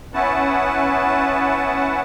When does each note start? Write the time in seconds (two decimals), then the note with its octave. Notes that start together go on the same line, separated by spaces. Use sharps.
0.14 B3 C#4 E4 B4 F#5 A5